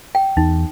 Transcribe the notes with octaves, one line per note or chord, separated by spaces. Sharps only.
G5
E2 D#4